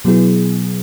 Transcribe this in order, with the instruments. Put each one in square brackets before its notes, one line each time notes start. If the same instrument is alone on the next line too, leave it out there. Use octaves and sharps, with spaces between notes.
[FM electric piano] B2 F#3 B3 E4 G#4